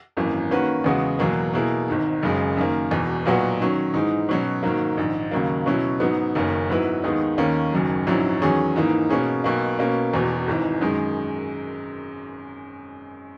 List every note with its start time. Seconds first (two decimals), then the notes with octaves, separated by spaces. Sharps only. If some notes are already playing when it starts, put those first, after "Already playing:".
0.17 G#1 F#2 E3 A#3
0.51 D#3 A#3 C#4 F#4 B4
0.84 E2 C#3 G#3 B3 F#4
1.19 E2 B2 F#3 A#3
1.53 B2 A#3 E4 G#4
1.88 G#1 G#2 D#3
2.23 F#1 F#2 C#3 G#3
2.57 F#2 D#3 A#3
2.91 E1 E2 B2
3.26 B1 A#2 F#3 B3 F#4
3.60 D#3 F#3 C#4
3.94 G#2 E3 G#3 D#4
4.29 B2 F#3 C#4
4.63 G#2 D#3 F#3 A#3
4.97 A#1 G#2 D#3
5.31 D#2 C#3 F#3 A#3
5.66 B2 F#3 C#4 E4
6.00 G#2 F#3 B3 D#4
6.35 F#1 F#2 D#3 A#3 C#4
6.69 G#2 F#3 B3 E4 B4
7.04 D#2 D#3 G#3 B3 D#4
7.38 D#2 D#3 A#3 C#4
7.72 F#1 F#2 D#3 F#3
8.07 A#1 G#2 F#3 C#4 E4
8.42 E2 D#3 F#3 C#4 G#4
8.76 G#2 E3 A#3 D#4
9.10 B2 A#3 C#4 G#4
9.44 B1 B2 A#3
9.79 B2 A#3 C#4
10.13 E1 E2 B2
10.48 G#1 G#2 E3
10.81 F#2 D#3 G#3